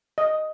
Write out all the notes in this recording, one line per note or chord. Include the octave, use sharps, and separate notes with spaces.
D#5